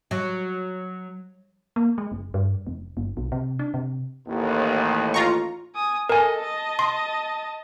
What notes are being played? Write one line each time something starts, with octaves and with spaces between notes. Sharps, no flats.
F#3
A#3
G#3
F#1
G2
F1
G1
B1
C3
D4
C3
A1 D#2
F4 A#5 C#6
G#5 D#6
A4 A#4 D#5 G#5
D#5 A5
C6